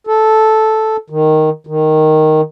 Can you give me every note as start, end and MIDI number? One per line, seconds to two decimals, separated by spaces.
0.07 0.97 69
1.10 1.50 51
1.67 2.41 51